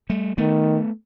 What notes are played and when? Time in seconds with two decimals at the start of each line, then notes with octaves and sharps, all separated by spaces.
0.09 G3 A3
0.38 D#3 A3 B3